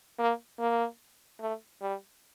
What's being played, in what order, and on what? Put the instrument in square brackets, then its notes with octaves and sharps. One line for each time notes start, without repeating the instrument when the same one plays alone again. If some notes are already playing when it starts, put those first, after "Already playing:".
[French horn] A#3
A#3
A3
G3